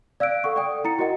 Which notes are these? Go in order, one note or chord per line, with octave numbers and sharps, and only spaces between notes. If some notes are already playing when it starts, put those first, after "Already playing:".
D5 F5 E6 F#6 D7
A4 F#5 C#6
D5 G5 D#6
E4 A#5 A6 C#7
F#4 A#4 D#5 F#5